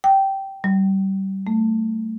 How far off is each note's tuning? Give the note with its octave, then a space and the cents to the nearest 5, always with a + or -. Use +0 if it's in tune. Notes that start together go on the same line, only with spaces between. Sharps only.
G5 -15
G3 -25
A3 +20